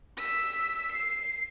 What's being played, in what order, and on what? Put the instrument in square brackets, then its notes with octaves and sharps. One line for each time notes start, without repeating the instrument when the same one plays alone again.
[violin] E6 B6
C7